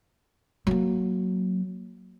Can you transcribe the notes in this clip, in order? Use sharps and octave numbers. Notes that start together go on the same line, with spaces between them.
F#3 A#3